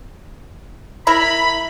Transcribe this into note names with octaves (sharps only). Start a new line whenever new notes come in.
E4 A#4 B5